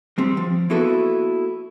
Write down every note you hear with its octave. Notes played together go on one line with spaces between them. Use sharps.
G3 C4 G4
F3
A#3 B3 E4 F#4 A4 B4